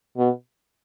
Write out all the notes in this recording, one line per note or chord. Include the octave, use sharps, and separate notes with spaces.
B2